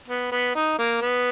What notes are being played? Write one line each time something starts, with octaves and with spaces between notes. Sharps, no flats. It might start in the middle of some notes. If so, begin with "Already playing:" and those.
B3
B3
D#4
A#3
B3